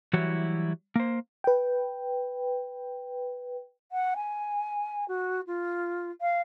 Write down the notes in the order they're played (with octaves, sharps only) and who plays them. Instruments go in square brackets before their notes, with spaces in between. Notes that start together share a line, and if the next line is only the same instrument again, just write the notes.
[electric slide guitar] E3 F#3 G3 E4 F#4 C#5
A#3 C5
[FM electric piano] B4 G5
[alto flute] F#5
G#5
F#4
F4
F5